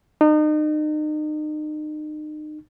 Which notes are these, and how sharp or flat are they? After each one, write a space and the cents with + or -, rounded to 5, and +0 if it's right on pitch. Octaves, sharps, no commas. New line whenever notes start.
D#4 -35